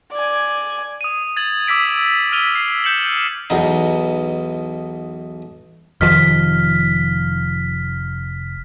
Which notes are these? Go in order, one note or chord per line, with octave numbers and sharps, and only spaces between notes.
D5 G#5
D#6 D#7
G#6 A6 F#7
D6 E6 B6 D7
F6 B6 D#7 F7 G7
C7
G6 C#7 E7 F#7
B1 E2 B2 D#4
F1 D#3 F3 F6 B6